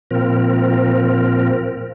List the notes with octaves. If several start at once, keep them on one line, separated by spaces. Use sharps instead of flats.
A#2 F3 C4 A#4